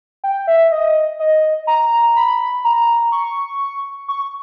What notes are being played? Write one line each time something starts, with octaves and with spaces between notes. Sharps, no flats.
G5
E5
D#5
D#5
A#5
B5
A#5
C#6
C#6